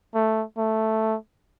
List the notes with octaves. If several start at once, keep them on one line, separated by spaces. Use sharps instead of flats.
A3
A3